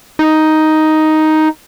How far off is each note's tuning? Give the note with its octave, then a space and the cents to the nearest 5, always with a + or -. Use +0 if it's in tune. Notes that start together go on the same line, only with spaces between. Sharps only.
D#4 +5